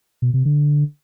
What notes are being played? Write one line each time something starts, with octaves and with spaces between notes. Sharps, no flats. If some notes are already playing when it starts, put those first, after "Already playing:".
B2
C3
D3